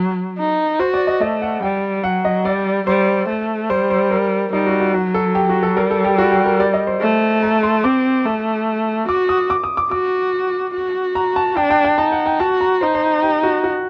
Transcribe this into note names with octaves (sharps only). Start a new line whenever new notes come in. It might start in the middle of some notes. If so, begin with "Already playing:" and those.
Already playing: F#3
D#4
F#4 C5
D5
D#5
A3 D#5
F#5
G3 G5
F#3 F#5
D#5
G3 D5
G3 C5
A3
G3 C5
C5
A#4
G3 D#4
F#4
F#4
F#3 F#4
A4
G4
F#4
A4
G3 A#4
A4
G4
F#4
G4
A#4
D5
D#5
C5
A3
A#5
C6
C4 D6
A3
F#4 D6
D#6
D6
D#6
D6
F#4 D6
F#4
A#5
A5
D4 G5
G5
G5
D#4 A5
F#5
G5
F#4 A5
A#5
D#4 C5
C5
G4
F#4
F#4